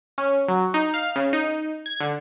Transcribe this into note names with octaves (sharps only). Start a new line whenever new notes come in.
C#4
F#3
D#4
F5
C#3
D#4
G#6
D3